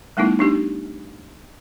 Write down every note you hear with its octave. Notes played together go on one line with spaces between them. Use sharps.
G3 A3 B3 D#4 E4
D4 D#4 G4